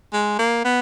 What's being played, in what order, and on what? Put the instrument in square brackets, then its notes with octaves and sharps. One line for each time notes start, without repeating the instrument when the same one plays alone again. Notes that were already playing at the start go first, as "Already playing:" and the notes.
[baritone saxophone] G#3
A#3
B3